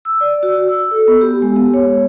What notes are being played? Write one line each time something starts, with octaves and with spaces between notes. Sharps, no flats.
E6
D5
F#4
E6
A4
B3
G4
G#3
B3
C#5